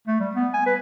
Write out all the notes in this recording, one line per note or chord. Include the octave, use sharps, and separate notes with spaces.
A3
G3
B3
G#5
B4